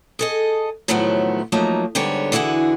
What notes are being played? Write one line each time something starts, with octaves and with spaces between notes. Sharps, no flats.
G#4 A4 D#5
A2 D#3 F3 F#3 A3 B3
F3 F#3 A3 A#3 D#4
G#2 D3 G3 B3 C#5
D3 E3 E4 F#4 G#4